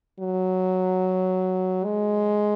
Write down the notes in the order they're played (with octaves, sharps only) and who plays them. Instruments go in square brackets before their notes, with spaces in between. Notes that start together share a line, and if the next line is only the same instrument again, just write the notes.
[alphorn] F#3
G#3